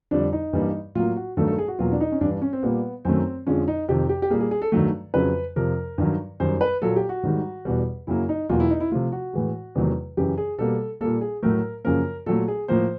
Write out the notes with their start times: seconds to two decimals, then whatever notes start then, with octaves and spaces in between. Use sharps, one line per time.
0.11 F2 D3 G3 D4
0.33 D#4
0.53 G2 E3 G3 A#3
0.95 A2 F#3 A#3 F4
1.16 F#4
1.37 G2 D#3 F#3 A3 A4
1.48 A4
1.58 G#4
1.68 F#4
1.79 E2 B2 F#3 A#3 F4
1.92 D4
2.01 D#4
2.12 C#4
2.21 G2 E3 G3 D4
2.31 D4
2.42 C#4
2.53 C4
2.63 A#2 G3 A#3 B3
3.05 F#2 D#3 F#3 A3 C4
3.47 F2 D3 F3 G#3 C#4
3.68 D#4
3.89 F2 C3 D#3 G4
4.09 G4
4.22 G4
4.30 A#2 G3 A#3 G#4
4.40 G#4
4.51 G#4
4.62 A4
4.72 G2 D#3 F#3 A3
5.14 F2 C#3 F#3 B4
5.56 F2 C3 F3 A#4
5.98 G2 D#3 F#3
6.40 F#2 D#3 G3 C5
6.61 B4
6.82 A#2 F#3 A#3 A4
6.96 G4
7.09 F#4
7.23 G#2 D#3 G3
7.65 E2 B2 G3
8.07 F#2 C#3 F#3 A#3 E4
8.29 D#4
8.49 E2 B2 F#3 A#3 F4
8.60 E4
8.70 D#4
8.80 E4
8.91 C3 F3 A3 F4
9.12 F#4
9.33 A2 E3 G#3
9.75 E2 C3 D#3 F#3 A3
10.17 F#2 C#3 E3 G4
10.38 G#4
10.58 B2 G3 A#3 A4
11.01 A#2 G3 A#3 A4
11.21 G#4
11.43 A2 F#3 A3 A#4
11.84 F#2 C#3 F3 A#3 A#4
12.26 A#2 F#3 A3 A4
12.48 G#4
12.68 A2 F3 A#3 C5